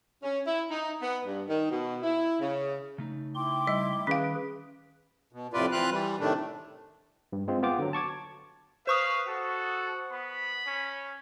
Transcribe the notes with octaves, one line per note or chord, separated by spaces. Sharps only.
C#4
E4
D#4
B3
G2
D#3
B2
E4
C#3
C#3 A3 D#4
E4 G5 C6 D6
G3 D#5
D#3 C#4 G#4 B4 F5
B2
F2 A2 C3 F4 B4 D5
E3 C4 F4 B4 F5 F#6
E3 G3
A2 C3 D#3 A3 D4
G2
G#3 C4 F4
B3 F4 G5 D6
D3 F#3
A5 C#6 D6 G#6
B4 C5 F5 C#6 D#6
F#4 A4
B3 B5
C#4